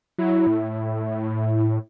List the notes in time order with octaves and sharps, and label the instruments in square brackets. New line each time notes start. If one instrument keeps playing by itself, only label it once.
[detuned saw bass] F#3 [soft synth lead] E4
[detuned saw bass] A2